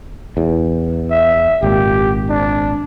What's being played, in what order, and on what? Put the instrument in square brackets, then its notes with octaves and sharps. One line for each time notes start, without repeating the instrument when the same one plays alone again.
[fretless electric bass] E2
[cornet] E5
[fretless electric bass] G#1 A#2 [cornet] G4
[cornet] D4